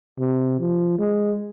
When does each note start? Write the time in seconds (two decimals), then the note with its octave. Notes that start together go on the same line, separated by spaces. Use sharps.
0.19 C3
0.60 F3
0.98 G#3